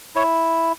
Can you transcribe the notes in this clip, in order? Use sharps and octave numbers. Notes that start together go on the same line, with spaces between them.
E4 C#5